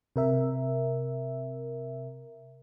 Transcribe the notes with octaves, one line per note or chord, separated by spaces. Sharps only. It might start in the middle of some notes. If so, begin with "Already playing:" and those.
C3 A#4 E5